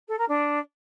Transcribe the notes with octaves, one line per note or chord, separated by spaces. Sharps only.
A4
A#4
D4